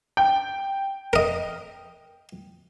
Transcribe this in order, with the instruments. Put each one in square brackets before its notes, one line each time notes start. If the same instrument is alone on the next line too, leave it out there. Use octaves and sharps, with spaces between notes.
[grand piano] G5
[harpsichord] A#4 D#5